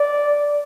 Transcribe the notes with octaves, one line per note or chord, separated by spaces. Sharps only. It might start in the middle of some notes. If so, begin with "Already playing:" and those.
Already playing: D5